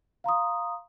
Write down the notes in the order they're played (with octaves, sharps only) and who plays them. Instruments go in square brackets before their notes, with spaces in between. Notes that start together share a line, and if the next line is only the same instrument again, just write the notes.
[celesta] F5 A#5 C6 D#6